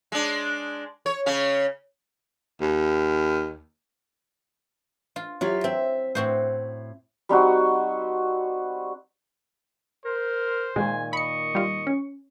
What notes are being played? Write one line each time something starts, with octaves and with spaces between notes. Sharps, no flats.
G#3 D4
C#5
C#3 C#4
D#2
F4
F#3 E4 F4 G4
C4 E5
A2 C4 F#4 C5
G3 C4 D#4 F#4
A#4 C5
A#2 D#3 G#3 G#5
D#5 B5 C#6 C#7
G3 F4
C#4